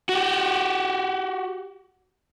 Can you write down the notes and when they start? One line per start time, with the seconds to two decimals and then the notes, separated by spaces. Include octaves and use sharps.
0.09 F#4 G4